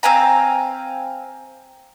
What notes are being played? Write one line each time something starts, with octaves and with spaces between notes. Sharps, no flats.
C4 F5 G#5 A#5